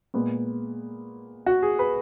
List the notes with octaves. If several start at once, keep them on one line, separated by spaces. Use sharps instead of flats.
A#2 G#3 B3
F#4
G#4
B4